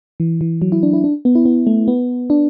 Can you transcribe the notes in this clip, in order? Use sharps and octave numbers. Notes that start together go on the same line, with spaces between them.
E3
E3
F#3
E4
D4
E4
D4
B3
E4
B3
A3
B3
D4